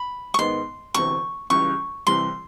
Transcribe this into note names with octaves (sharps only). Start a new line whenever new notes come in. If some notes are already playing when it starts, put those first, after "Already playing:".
Already playing: B5
C#6
G#2 D#3 G#3 B3 C6
E1 D2 C3 E3 C#6
C#2 C#3 E3 G3 C#6
C2 C3 E3 G3 C6